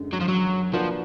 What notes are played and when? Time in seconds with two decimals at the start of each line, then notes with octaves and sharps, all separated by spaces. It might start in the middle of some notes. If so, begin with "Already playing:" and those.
Already playing: F#2 D3 G#3
0.13 F#3
0.21 F3
0.29 F#3
0.74 F3 A#3 D4 F#4 B4